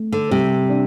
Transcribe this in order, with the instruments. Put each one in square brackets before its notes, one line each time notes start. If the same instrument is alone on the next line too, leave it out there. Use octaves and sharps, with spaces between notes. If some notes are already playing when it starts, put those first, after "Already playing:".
Already playing: [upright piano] A3
[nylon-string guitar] D3
[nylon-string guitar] C3 [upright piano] G3
[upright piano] D4